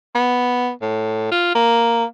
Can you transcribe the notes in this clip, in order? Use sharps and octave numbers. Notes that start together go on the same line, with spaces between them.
B3
A2
F4
A#3